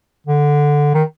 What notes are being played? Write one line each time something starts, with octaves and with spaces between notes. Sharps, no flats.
D3
D#3